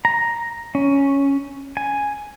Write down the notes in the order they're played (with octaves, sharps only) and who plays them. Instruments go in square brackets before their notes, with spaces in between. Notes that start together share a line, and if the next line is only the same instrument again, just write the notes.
[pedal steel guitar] A#5
C#4
G#5